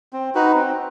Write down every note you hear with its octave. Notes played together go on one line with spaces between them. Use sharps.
C4
D#4 F#4 B4
C4